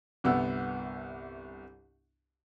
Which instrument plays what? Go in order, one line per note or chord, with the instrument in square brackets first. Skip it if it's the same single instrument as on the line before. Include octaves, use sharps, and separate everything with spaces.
[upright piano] G1 C2 B3 F#5 E6